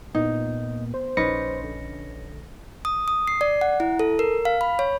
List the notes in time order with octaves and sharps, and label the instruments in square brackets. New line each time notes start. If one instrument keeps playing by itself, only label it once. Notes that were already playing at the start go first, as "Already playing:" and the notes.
[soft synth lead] A#2 [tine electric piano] B3 [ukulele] D#4
[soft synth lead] C5
[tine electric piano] A#1 A#6 C#7 [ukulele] C#4 D#4 B4
[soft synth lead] D3
[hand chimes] D#6
D#6
C7
D5
F#5
E4
A4
A#4
F5
B5
C#5